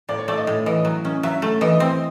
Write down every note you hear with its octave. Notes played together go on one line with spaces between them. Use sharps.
A2 D5
C#5
A3 D5
D#5
A2
E3 D#5
F#3
C#4
F#3 E5
A3
E3 D#5
C4